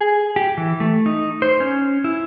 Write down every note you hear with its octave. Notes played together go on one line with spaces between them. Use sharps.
G#4
G4
E3
A3
D#4
C5
C#4
E4